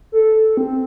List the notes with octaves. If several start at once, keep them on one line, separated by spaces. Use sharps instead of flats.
A4
C4